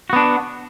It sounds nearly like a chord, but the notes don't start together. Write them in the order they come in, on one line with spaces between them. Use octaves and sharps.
F#4 B3 D4